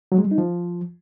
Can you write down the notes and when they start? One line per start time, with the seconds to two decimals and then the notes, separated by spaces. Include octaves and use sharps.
0.12 F#3
0.18 G#3
0.25 G3
0.31 D#4
0.38 F3